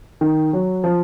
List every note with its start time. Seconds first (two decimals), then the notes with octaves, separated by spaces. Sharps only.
0.21 D#3
0.53 F#3
0.84 F3